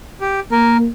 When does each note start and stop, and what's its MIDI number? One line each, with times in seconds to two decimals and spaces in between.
0.21 0.40 67
0.52 0.87 58
0.52 0.77 70